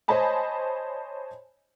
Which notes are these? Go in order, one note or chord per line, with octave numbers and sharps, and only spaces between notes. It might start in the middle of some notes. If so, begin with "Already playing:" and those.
C5 C#5 D#5 G#5 A5 B5